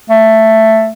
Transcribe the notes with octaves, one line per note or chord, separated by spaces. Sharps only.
A3